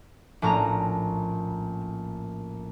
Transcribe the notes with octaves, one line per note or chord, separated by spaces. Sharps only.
A#1 A2 C#4 A#5